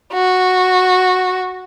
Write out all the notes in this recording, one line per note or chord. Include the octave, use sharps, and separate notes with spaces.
F#4